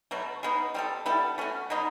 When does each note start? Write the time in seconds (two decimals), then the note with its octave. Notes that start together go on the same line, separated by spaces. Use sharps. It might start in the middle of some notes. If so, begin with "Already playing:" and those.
0.11 B2 F#3 A3
0.43 G#3 B3 D#4
0.74 G3 C4 F4 A4
1.06 G3 B3 E4 A4
1.38 A3 C#4 F#4
1.70 B2 F#3 B3 D#4